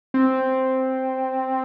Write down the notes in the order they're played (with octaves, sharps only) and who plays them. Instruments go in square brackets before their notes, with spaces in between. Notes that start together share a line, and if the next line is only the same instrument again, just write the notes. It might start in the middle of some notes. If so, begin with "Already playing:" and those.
[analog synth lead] C4